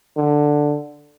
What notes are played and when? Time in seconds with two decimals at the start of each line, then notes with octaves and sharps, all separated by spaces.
0.17 D3